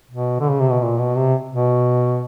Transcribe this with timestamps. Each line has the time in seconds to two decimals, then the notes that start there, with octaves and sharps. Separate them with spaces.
0.11 B2
0.40 D3
0.50 C#3
0.60 C3
0.70 B2
0.82 A#2
0.98 B2
1.16 C3
1.51 B2